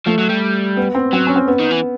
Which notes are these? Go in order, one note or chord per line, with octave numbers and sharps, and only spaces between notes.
F3 A3
F#3
G3
B3
C4
F#3 C4
C#4
C4
B3
D#3
E3